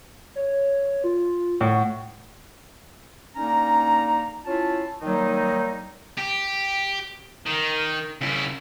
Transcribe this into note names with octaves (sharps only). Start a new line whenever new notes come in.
C#5
F4
A2 F#5
D3 A#3 C#4 D#4 A#5
C#4 E4 F4 A5
D#3 F#3 G3 A#3 D#4
G4
D#3
C#3 E4